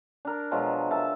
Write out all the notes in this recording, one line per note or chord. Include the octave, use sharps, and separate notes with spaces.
D4 A#4
B2 F3 F#3 G#3
A#4 E5 A5